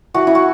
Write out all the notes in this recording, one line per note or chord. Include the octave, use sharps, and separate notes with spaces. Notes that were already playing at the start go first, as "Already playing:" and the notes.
E3 F#4
E4
F#4